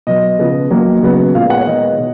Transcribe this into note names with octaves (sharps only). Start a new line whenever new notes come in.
B2 F#3 B3 D#5
C#3 F3 B3
D#3 F#3 A#3
C#3 F#3 B3
A#2 F3 G#3 B3 F5
F#5
C#5
D#3 G#3 B3 D#5
B2